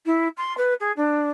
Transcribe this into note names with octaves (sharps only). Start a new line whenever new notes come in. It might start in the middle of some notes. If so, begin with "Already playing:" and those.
E4
C6
B4
G#4
D4